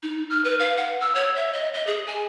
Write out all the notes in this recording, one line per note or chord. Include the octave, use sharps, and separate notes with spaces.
D#4
F6
B4
F5
F#5
E6
C#5
E5
D#5
D#5
G#4
G#5